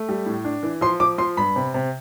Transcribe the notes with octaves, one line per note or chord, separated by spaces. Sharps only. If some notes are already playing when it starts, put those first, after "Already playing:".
Already playing: A3
G3
A2
D4
E3
F3 C6
F3 D6
F3 C6
G2 B5
C3
C3